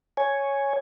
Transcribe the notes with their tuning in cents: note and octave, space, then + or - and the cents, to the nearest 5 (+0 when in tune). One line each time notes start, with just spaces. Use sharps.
C#5 +0 G#5 +0